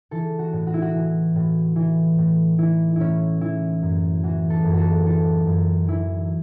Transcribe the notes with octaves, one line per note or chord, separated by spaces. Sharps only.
E3 A4
F#4
A2
F#4
E4
F#4
E3
A2
E3
A2
E3 E4
A2 C#4 E4
E3 E4
F#2
E3 F#4
A4
F#2
F#4 A4
E3 A4
F#2
E3 E4